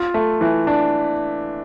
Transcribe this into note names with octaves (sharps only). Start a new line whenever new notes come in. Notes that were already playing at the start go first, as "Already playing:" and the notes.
Already playing: F4
A3
E3
D4